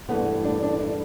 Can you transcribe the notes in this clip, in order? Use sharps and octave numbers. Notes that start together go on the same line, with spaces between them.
G2 E3 A3 B3
D4
D4
E4